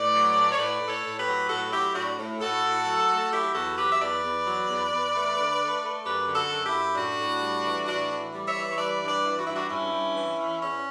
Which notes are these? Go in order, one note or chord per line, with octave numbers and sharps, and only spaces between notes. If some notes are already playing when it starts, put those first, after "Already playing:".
Already playing: A2 B4 D5
F#3
A2
C#5
A2 B4 D5
A2
A4 C#5
A2
G4 B4
F#3
A2 F#4 A4
F#3 E4 G4
A2 D4 F#4
A2
A2 F#4 A4
A2
F#3
A3
F#3 E4 G4
E2 F#4 A4
F#3 G4 B4
E5
E2 B4 D5
E2
F#3
E2
E2
A3
D3
A3
A3
F#2 G4 B4
D3
F#4 A4
F#2
E4 G4
F#2
A2 D4 F#4
A2
G3
E3
A2 D4 F#4
E3
G3
C#5 E5
E3
C#5
G3 B4 D5
G2
B4 D5
E3
F#4
G2 E4
D4 F#4
G2 C#4 E4
G2
E3
E3
E2 C#4